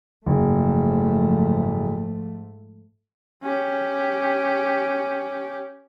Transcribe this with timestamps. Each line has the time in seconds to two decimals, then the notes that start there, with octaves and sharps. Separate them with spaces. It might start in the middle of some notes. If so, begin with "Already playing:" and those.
0.26 F#1 G#2 F3 A3
3.43 C#4 G4